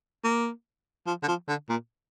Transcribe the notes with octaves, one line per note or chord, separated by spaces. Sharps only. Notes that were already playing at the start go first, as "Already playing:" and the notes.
A#3
F3
D3
F3
D3
A#2